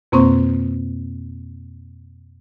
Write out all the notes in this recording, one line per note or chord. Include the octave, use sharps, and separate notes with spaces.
F2 B2 A#3 C4 C5 C#6